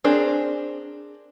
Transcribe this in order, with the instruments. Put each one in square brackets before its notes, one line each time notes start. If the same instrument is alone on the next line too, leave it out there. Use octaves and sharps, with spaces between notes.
[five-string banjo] C4 D4 G#4 A#4 C5